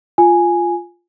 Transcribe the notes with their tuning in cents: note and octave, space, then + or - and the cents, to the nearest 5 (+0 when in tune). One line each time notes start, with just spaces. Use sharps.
F4 +0 G#5 +0